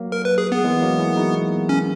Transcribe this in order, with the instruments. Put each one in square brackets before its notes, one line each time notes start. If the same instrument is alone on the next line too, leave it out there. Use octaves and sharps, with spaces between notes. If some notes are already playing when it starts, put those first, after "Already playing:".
Already playing: [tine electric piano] F#3 A#3
[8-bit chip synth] A#4
B4
G#4
B3
[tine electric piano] E3 G#3
F#3 A#3
E4 G#4
D#4 F#4
[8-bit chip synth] C#4